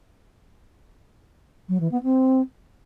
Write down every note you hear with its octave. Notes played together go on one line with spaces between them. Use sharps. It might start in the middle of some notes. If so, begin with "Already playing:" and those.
F#3
E3
B3
C4